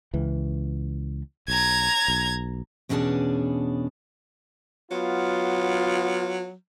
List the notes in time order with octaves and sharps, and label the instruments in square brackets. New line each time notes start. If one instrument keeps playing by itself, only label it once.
[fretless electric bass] C#2 E3
[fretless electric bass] B1 [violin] A#5 G#6
[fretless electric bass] B1
[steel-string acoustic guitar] E2 B2 C#4 D4 G#4 A5
[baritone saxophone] F#3 [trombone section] B3 F4